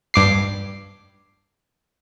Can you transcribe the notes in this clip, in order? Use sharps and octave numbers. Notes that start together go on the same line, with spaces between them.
G2 D6 C7